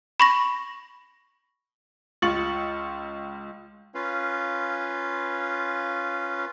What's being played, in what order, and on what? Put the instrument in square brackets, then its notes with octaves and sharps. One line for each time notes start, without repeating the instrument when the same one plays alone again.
[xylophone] B5 C#6 A#6
[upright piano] C#2 F4 C#6 A6 C#7 F#7
[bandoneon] C#4 F4 B4 F5